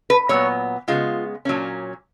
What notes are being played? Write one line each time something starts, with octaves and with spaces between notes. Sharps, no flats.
B4
A#2 F#3 B3 C#5
C#3 G#3 B3 F4
A#2 F#3 A#3 C#4